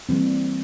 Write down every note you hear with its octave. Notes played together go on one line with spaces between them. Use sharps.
E3 G3 A#3 C4